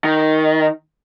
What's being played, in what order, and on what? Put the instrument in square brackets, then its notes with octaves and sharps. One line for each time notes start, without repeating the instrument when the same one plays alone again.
[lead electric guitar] D#3